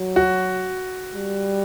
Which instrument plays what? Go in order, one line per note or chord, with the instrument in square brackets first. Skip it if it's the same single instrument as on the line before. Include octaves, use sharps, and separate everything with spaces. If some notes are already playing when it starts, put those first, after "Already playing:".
Already playing: [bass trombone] F#3
[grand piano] F#4
[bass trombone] G3